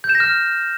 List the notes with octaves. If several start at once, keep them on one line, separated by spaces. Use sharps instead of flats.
G6
E7
A#6
F6